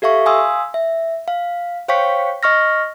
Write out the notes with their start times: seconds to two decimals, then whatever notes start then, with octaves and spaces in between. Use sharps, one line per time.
0.02 G4 A4 E5 F5 C#6
0.26 F5 G#5 C6 D#6 E6
0.74 E5
1.28 F5
1.88 C5 C#5 F5 G5 C#6 B6
2.43 D#5 C#6 F6 A#6